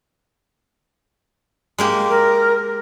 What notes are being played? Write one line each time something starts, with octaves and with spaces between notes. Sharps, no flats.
G#3 A#3 G4
A#4